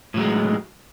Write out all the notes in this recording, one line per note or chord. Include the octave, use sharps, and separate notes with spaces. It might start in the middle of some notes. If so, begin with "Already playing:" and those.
A2 F#3 G#3